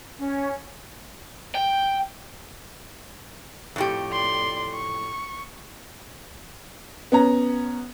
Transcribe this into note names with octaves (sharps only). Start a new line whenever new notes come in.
C#4
G5
F2 A2 G4
D5 C6
C#6
B3 C#4 A#5